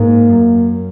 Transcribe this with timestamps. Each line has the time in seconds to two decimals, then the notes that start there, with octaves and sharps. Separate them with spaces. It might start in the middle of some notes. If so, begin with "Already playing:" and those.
Already playing: G#2 A#3
0.28 F#2